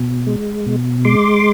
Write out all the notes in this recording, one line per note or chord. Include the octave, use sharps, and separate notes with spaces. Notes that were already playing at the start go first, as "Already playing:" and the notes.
Already playing: B2
G#3
B2
G#3 C6 D6